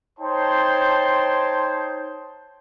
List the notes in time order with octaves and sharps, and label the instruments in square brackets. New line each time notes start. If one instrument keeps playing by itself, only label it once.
[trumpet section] D#4 C5 C#5 G5 A5 C6